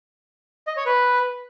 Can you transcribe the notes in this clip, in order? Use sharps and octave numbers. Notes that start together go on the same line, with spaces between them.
D#5
C#5
B4